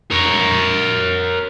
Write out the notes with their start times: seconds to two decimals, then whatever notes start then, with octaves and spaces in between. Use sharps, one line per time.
0.11 A#4 C#5